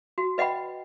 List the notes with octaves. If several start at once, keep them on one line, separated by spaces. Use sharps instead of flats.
F#4
B4 D#5 F#5 G5 B5